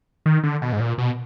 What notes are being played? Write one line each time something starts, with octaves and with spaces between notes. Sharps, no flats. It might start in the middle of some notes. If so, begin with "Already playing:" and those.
D#3
D3
B2
G#2
A#2
B2